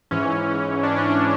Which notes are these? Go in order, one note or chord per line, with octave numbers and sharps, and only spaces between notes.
G#2 E3 C#4
D4
C#4
D4